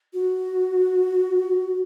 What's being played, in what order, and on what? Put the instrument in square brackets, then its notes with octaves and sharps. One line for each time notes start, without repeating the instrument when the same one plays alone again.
[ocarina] F#4